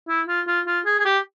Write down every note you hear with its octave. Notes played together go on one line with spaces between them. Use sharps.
E4
F4
F4
F4
G#4
G#4
G4